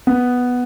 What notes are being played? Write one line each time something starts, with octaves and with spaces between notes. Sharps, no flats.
B3